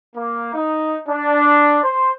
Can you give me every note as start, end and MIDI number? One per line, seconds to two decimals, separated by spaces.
0.15 0.52 58
0.54 0.96 63
1.08 1.79 62
1.84 2.11 72